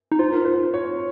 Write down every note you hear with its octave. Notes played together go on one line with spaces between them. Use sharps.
D#4
F4 C5
A#4
C5
C#5